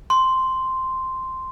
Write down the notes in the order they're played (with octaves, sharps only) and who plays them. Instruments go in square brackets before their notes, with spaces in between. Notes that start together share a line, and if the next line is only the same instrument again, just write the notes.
[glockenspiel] C6